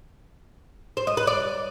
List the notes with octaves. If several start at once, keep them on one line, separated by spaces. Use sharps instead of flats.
C5
D#5
B4
D5